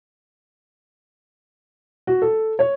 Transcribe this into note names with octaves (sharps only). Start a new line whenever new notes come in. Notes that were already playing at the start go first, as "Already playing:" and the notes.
F#4
A4
C#5